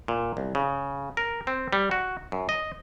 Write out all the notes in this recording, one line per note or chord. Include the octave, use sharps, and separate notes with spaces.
A#2
C2
C#3
A#4
C4
G3
F#4
F#2
D#5